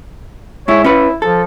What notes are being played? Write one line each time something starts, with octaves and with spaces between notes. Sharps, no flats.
G#2 E4 C#5
C#4 E4 B4
F3 A4